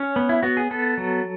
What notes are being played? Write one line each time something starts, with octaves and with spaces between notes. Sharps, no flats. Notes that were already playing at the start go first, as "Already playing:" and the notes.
Already playing: C#4 C#5
B3
E4
B3 F#4
G#4
B3 A4
F#3